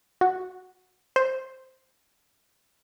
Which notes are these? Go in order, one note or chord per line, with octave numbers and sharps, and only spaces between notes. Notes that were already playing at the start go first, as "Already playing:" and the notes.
F#4
C5